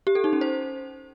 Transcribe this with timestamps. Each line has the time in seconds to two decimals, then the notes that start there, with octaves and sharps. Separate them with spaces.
0.07 G4
0.15 A4
0.24 D#4
0.33 C#4
0.41 C5